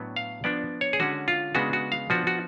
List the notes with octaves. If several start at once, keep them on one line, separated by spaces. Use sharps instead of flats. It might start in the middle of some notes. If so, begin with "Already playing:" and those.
Already playing: A2 F#3 B3 D4
F5
F3 B3 D4 D5
C#5
G#4
D3 G#3 C#4 F#4
F4
C#3 G#3 B3 D4 F#4
F#4
F5
F3 B3 D4 F#4
F#4